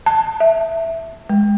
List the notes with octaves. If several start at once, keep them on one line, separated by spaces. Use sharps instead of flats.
A5
E5
G#3